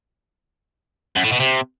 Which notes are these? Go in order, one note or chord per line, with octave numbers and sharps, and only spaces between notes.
F#2
A2
B2
C3